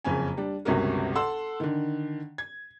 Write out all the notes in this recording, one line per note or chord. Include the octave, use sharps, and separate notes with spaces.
F#1 F2 C#3 C#4 G#5
G3 D4
G1 C#2 C3 C#4 F#4 A#4
A4 F#5 C6 E6
D3 D#3
G#6